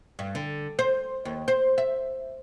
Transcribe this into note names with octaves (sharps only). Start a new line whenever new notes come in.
G2
D3
C5
D#2
C5
E5